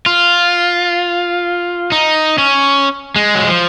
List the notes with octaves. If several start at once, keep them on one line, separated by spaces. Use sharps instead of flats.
F4
D#4
C#4
G#3
F#3
F3